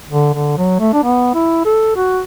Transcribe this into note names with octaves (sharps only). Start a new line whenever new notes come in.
D3
D3
F#3
A3
D4
B3
E4
A4
F#4